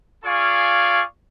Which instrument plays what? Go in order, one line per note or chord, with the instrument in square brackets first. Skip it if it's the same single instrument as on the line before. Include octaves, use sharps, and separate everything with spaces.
[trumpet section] F4 G#4 D5 F5 G#5 C#6